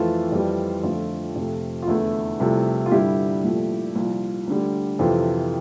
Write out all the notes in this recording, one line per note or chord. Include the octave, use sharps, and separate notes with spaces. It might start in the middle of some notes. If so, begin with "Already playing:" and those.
Already playing: F2 E3 A3 F4 A4
F2 E3 G3
F2 D3 F3 A3 F4
F2 C3 F3 A3
F4
E2 D3 A3 E4
C2 C3 F3 A3
F4
G2 D3 G3 E4 G4
C2 A#2 F3 A3
C2 A#2 F3 F4
D2 D3 G3
F2 C3 E3 F4 A4